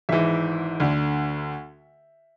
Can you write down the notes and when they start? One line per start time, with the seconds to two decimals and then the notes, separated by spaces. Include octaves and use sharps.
0.09 G#1 G#2 E3 E5
0.80 D2 D3